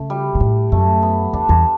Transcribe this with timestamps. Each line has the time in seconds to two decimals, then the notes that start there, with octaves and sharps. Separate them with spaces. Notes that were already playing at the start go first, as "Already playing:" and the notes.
Already playing: C#3 A3
0.10 G3
0.35 B2
0.40 A2
0.72 F#2 A3
1.03 B3
1.33 E2 D4
1.49 E2 D4